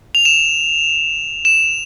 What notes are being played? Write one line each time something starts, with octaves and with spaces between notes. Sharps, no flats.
F7
E7
E7